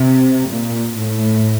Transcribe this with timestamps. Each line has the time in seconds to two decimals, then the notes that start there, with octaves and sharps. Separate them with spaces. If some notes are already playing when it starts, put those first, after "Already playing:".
Already playing: C3
0.50 A#2
0.97 A2